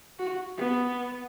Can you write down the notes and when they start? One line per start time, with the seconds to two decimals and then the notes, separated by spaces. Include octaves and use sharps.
0.19 F#4
0.57 B3